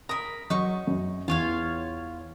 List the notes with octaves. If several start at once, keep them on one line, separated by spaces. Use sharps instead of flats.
A#4 B5 D#6
F#3 D#4 C#6
F#2
E2 F4 C#5 F5